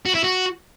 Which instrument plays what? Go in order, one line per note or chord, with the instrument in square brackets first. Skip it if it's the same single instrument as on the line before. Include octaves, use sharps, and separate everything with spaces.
[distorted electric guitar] F#4
E4
F#4